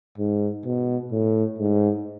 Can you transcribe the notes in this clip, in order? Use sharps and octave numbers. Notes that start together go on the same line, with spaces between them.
G#2
B2
A2
G#2